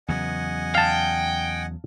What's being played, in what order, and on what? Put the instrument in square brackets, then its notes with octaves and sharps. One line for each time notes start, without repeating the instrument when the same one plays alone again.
[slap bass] E2 C#3 F#3 [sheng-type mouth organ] D#5 F#5 G#5
[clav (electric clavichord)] F5 A5 [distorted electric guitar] G5